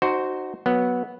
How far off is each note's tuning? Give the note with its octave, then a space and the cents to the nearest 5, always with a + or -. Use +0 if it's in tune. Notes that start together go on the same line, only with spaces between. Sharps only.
D#4 -25 F#4 +5 C5 +0
F#3 +0 B3 -10